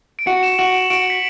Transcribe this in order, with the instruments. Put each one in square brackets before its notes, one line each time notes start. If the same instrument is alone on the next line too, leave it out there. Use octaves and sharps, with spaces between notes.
[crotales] D7
[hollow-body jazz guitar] F#4 [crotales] C#7
[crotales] E7
[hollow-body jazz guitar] F#4 [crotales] F#7
[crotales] D7
[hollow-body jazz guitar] F#4 [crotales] D7
[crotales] C#7
B6